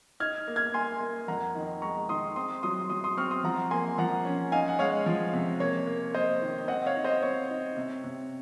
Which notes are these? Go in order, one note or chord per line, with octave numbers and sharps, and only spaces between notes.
D#4 F6 G#6
A#3
F6 G#6
A#3 G#5 C6
A#3
F2 F#5 A#5
D#3
G#3 A#5 C#6
D#3 C6 D#6
C4 C6 D#6
F#3 C6 D#6
F#3 C6 D#6
C6 D#6
C4 C#6 F6
C6 D#6
F3 F#5 A#5
A#3 G#5 C6
F3 F#5 A#5
C#4
D#4 F5 G#5
F#5
G#3 C#5 F5
F3
C3
A#3 C#5
A#3
A#3 C5 D#5
D#3
C4 D#5 F#5
C#5 F5
D#4
C5 D#5
C4 C#5
D#4
C3
C3